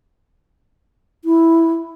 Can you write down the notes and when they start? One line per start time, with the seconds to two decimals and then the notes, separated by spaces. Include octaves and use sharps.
1.25 E4